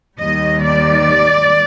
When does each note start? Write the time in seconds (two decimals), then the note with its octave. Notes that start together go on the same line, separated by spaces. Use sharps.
0.20 D#2 D#3 G3 D#5
0.65 D5